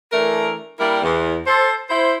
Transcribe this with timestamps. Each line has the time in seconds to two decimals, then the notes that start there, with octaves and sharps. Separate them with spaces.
0.13 E3 A3 D4 A#4
0.80 G3 A#3 D4 E4 A#4
1.02 E2
1.47 A4 C5
1.90 E4 C5